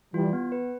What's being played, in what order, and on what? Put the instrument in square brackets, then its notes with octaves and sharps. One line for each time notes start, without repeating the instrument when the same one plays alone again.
[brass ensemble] E3 G3 [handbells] F4
[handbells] B3
B4